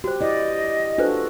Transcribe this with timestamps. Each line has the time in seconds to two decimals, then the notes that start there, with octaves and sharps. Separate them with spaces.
0.04 F#4 G4 C5
0.21 E4 D5 D#5
0.98 D4 F4 F#4 A4 B4 C5